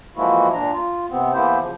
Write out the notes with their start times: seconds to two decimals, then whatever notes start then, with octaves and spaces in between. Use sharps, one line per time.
0.16 E3 F3 G#3 A#3 E4 F#4
0.53 A#2 D4 A#5
0.73 F4
1.10 C3 B3 C4
1.34 E3 A#3 B3 E4 G4 C5
1.59 C#3 F3